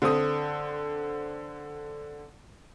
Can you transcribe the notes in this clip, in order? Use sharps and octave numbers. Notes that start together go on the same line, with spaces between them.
D3 C4 D#6